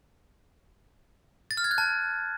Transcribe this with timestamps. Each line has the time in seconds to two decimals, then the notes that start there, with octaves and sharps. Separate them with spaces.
1.51 A6
1.57 F6
1.64 G#6
1.71 F#6
1.78 A5